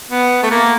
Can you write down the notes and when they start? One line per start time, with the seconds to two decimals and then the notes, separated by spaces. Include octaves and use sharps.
0.11 B3
0.43 A3
0.51 A#3